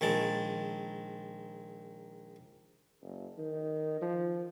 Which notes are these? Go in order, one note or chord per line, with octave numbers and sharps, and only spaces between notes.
A#1 D#3 G#3 A5
F#1
D#3
F3